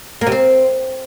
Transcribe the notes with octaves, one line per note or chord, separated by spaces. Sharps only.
A#3
C3
C4